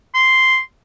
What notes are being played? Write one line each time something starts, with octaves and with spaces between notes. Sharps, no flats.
C6